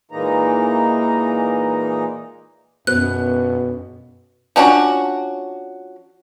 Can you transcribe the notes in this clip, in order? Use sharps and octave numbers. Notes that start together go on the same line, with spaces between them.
A#2 E3 G#3 A#3 D#4 A#5
F#2 B2 B3 F#6
F3 C#4 D4 F#4